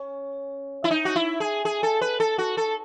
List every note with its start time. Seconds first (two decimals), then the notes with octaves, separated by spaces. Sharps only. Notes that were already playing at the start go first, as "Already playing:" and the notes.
Already playing: C#4
0.84 E4
0.91 D#4
1.05 F#4
1.16 E4
1.40 G#4
1.65 G#4
1.83 A4
2.01 B4
2.20 A4
2.38 F#4
2.57 A4